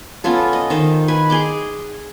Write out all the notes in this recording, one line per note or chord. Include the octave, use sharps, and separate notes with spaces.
B3 C#4 F4 A4
D#5
D#3 C5
B4 G#5
G#4 C6 D6